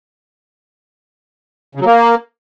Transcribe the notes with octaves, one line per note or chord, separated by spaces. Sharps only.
C#3
F#3
A#3